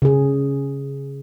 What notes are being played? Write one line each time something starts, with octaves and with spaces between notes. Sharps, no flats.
C#3 G#4